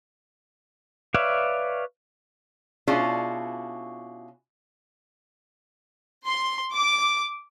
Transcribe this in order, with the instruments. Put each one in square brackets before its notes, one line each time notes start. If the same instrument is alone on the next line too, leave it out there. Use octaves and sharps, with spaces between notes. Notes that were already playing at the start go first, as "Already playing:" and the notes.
[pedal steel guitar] B4 C#5 D5 E5 F5
[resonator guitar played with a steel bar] B2 C#4 D4 E4 F4 G#4
[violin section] C6
D6